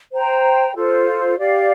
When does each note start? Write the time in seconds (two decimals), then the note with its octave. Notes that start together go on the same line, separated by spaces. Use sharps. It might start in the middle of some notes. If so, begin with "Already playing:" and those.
0.12 C5 G5 A#5
0.75 F4 A4 C5
1.38 G4 D5 F5